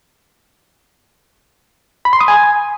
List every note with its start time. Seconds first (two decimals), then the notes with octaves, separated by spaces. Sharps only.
2.05 B5
2.13 C6
2.20 D#6
2.28 G#5